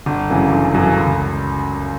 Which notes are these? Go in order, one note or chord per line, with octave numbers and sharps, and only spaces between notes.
G1
F#2 C#3 E3
G1
F#2 C#3 E3
C#2